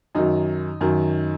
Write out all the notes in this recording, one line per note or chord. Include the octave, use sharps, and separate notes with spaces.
F#2 D#3 F#3 D#4
F#2 D#3 F#3